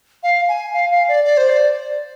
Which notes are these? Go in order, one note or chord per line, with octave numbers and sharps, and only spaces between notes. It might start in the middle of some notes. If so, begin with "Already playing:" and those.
F5
G#5
F5
F5
D5
D5
C5
D5